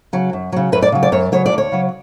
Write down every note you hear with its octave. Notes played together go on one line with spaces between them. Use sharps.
C#3 F#3
F#2
C#3 F#3
F#2 B4
D5
C#3 F#3
D5
F#2 C#5
C#3 F#3 C#5
D5
D2
C#5
C#3 F#3